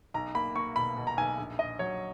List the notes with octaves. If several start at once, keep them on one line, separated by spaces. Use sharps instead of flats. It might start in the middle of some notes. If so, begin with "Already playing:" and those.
B1 A#5
A#3 B5
A#3 C#6
B2 B5
B2
A#5
B1 G#5
A#1
A#1 D#5
F#3 C#5